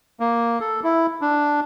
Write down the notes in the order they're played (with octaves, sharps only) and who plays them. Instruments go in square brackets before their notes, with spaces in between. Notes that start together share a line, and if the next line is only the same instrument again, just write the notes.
[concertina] A#3
A4
E4
D4